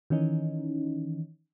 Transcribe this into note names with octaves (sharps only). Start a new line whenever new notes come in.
D#3 E3 C#4 D#4